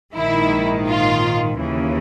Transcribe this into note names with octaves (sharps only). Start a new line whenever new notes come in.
A#1 G#2 D#3 E4
F4
D#2 C#3 E3